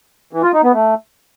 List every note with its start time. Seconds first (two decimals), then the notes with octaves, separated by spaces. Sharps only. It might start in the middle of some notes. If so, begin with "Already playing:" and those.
0.33 E3
0.43 F4
0.53 D#4
0.63 B3
0.73 A3